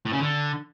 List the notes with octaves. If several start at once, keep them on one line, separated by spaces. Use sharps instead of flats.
A2
C#3
D3